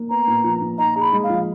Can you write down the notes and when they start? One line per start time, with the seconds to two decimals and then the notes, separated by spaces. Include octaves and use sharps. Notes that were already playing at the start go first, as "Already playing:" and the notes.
Already playing: A#3
0.10 B3 A#5
0.27 A#2
0.44 F3
0.62 A#2
0.78 D#4 A#5
0.96 G#4
1.01 B5
1.13 G#3
1.23 F5
1.29 F3